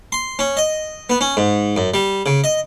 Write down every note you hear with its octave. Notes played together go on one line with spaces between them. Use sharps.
C6
C#4
D#5
B3
C#4
G#2
F#2
G3
C#3
D#5